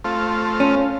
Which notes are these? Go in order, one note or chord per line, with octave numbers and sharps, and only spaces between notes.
A3 C4 F4
C#4